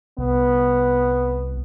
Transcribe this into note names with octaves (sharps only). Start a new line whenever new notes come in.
C2 B3